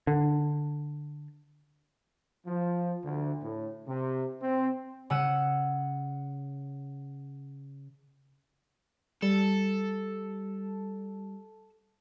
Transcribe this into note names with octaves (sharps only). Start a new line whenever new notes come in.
D3
F3
D2
A2
C3
C4
C#3 F#5 E6 D#7
G3 A4